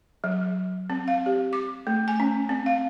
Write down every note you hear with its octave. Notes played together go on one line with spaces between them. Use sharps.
F#3
C4
F5
G4
D6
A3
G#5
C#4
C4
F5